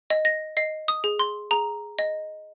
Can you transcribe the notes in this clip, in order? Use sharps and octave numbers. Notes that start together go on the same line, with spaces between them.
D#5
A#6
D#5 C7
D#6
G#4
C6
G#4 A#5
D#5